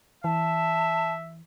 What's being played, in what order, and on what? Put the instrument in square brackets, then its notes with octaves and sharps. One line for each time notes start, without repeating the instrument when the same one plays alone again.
[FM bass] E3 [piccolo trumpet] E5 [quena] A5